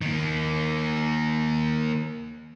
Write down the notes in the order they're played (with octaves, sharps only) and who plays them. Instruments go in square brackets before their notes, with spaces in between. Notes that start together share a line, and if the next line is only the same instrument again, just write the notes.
[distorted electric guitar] D#3 A#3